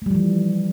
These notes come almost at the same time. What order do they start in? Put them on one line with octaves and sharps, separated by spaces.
A3 G3 F3 E3